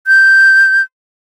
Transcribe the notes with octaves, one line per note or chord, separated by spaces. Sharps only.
G6